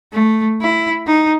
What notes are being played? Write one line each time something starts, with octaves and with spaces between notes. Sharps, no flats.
A3
E4
D#4